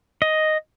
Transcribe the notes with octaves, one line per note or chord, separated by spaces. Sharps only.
D#5